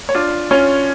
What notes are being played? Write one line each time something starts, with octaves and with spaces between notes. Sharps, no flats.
C#5
D4 F4 D5
C#4 F4 C#5